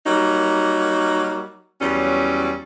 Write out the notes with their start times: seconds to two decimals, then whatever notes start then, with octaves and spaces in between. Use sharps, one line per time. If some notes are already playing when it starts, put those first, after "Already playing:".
0.06 F#3 G3 A#3 D#4
1.81 E2 F#3 G3 C#4